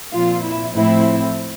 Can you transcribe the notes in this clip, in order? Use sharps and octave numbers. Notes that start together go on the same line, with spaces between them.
A#2 F3 C4 F4
E4
A2 F3 A3 C4 E4